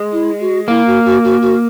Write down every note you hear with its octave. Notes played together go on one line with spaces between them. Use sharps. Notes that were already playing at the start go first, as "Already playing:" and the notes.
Already playing: G#3
E4
F#4
A#3 E4
F#4
F#4
F#4
F#4